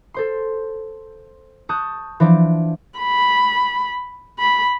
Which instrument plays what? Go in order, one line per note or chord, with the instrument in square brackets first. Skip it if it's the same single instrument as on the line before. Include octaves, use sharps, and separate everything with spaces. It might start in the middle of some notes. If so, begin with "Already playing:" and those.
[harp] A4 C5 C6
A5 C#6 D#6 F#6 G6
E3 F3 D4 D5
[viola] B5
B5